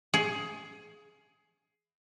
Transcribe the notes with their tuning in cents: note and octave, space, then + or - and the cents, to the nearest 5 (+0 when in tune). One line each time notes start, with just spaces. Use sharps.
G#4 +15